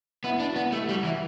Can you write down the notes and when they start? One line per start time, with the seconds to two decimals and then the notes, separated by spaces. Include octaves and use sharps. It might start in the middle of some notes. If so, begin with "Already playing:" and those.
0.24 B3 E4
0.40 D4
0.49 F#4
0.56 B3
0.72 A3 G4
0.89 G3 F#4
1.04 E3 E4